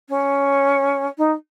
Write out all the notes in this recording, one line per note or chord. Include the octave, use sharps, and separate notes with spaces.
C#4
D#4